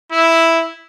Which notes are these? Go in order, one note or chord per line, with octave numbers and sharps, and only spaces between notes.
E4